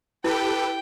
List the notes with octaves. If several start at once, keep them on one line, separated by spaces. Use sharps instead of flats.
E4 G4 A4 B4 G5